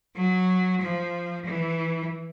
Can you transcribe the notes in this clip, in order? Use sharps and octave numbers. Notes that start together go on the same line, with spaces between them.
F#3
F3
E3